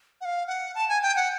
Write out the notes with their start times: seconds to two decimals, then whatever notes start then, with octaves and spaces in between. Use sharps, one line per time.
0.21 F#5
0.25 F5
0.47 F#5
0.75 A5
0.89 G#5
1.03 G5
1.16 F#5